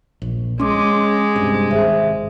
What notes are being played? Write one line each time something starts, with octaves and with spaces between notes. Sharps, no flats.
A#1
G#3 C#4 C6 D6
G2 C3
G#1 G#4 C5 E5